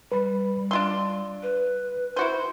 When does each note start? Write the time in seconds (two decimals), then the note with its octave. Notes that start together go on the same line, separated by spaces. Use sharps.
0.12 G3 B4 B5
0.71 D4 F4 C6 E6
1.43 B4
2.16 E4 F#4 C5